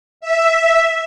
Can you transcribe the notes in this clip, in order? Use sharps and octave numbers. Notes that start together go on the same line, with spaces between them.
E5